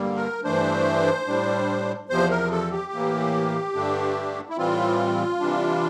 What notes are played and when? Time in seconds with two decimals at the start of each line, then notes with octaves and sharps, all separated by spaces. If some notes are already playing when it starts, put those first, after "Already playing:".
Already playing: G2 D3 G3 A#3
0.16 A#4
0.44 G2 E3 A3 D4 C5
1.27 A2 G3 D4
2.09 E2 C3 F3 C5
2.30 A#4
2.51 A4
2.71 G4
2.92 A2 E3 A#3
3.74 G2 D3 A3 D4
4.50 E4
4.57 A2 E3 G3 C4 F4
5.39 C3 E3 G3 D4